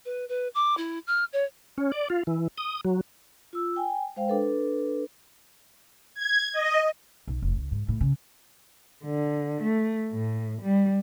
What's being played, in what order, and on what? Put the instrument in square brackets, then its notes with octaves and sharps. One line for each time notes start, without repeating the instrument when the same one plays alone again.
[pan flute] B4
B4
D6
E4
F6
C#5
[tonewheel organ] C#4
D5
F4
E3
D#6
F#3
[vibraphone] F4 E6
G5 G#5
G#3 C5 F5 G5
D4 A4 B4
[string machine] G#6
D#5
[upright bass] B1
F1
C#2
G#2
A2
C#3
[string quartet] D3
A3
A2
G3